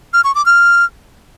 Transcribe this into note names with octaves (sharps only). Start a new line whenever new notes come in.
F6
C#6
D6
F6